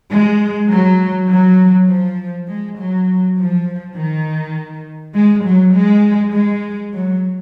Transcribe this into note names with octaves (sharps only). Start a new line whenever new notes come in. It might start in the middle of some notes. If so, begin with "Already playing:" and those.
G#3
F#3
F#3
F3
G#3
F#3
F3
D#3
G#3
F#3
G#3
G#3
F#3